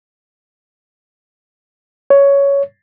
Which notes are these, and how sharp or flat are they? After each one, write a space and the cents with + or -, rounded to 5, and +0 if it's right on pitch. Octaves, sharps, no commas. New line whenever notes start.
C#5 +10